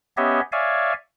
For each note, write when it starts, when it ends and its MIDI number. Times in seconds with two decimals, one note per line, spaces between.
0.17 0.41 59
0.17 0.41 61
0.17 0.41 67
0.17 0.41 73
0.17 0.41 75
0.17 0.41 76
0.52 0.93 73
0.52 0.93 74
0.52 0.93 76
0.52 0.93 77
0.52 0.93 80